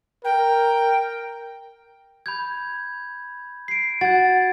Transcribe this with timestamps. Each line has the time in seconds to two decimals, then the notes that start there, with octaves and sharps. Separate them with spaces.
0.25 A#4 G5
2.26 B5 G6 G#6
3.68 C7 D7
4.01 F#4 G#6 A6